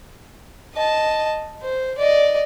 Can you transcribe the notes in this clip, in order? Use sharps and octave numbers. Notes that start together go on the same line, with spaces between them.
D#5 A5
C5
D5 D#5